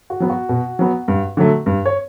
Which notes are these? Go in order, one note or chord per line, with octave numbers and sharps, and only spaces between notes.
F#4
F#3 B3
F#4
B2
F#3 B3
G2
D3 F#3 A3
G2
C#5